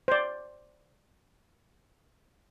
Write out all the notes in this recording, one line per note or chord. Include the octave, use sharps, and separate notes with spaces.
C5 D5